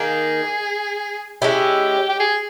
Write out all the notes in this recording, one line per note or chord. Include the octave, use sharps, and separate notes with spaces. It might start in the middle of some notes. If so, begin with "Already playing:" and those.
Already playing: D#3 A#3 D#4 G#4
G#3 C#4 E4 G4
G4
G#4